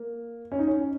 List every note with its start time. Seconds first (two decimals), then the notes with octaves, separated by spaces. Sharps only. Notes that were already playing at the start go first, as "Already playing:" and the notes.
Already playing: A#3
0.52 C#4
0.59 D#4
0.67 C#4